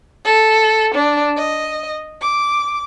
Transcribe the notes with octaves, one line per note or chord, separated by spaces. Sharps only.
A4
D4
D#5
D6